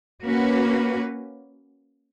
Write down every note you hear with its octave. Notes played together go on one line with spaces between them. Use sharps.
A#3 C#4 F#4 B4